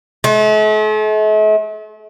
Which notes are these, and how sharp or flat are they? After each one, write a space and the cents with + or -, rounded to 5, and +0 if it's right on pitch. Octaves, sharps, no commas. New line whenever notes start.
A3 -45